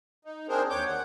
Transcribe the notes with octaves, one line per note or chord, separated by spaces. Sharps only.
D#4
C4 D4 G#4 A#4 C5
D#2 C#5 D6 G6
F#5